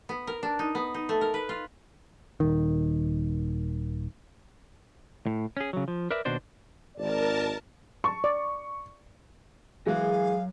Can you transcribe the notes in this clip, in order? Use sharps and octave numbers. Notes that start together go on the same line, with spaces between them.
B3
A#4
D4
D#4
B3
D#4
A3
A#4
B4
F4
D#1 D#3
A2
C#4 G#4
C#3 F#3
F3
A#4 B4 D5 E5
D#2 B2 D4 F#4 C5 D5
G#1 A#4 D5 A5
A5 C#6
D5
E3 F#3 G#3 G#4 F5 G#5